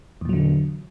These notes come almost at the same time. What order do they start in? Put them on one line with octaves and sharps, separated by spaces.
E2 A#2 F#3 D3